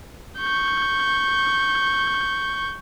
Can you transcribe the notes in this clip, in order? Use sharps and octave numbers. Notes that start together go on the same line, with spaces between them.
C#6 G6